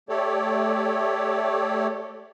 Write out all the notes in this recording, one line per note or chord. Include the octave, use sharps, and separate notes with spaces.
A3 G4 A4 C#5 D5